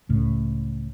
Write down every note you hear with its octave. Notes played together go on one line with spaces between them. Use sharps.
C#2 A2